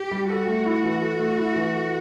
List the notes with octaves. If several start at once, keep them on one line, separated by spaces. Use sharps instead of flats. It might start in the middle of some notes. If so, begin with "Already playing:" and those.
Already playing: G4
G3
F#4 A4
A3
E4
E3
A4
A3
E4
E3
A4